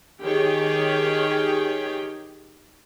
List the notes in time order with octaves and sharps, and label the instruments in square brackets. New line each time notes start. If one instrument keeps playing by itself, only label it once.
[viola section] D#3 G4 G#4 C#5 G5